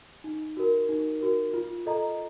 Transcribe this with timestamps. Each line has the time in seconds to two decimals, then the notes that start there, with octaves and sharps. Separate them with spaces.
0.24 D#4
0.57 F#4 A#4
0.89 D#4
1.21 F#4 A#4
1.54 F4
1.86 A4 D#5 A#5